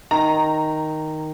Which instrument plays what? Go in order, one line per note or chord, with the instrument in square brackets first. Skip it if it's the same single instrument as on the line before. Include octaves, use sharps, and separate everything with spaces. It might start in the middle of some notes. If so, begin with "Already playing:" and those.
[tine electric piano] D#3 [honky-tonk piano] A#5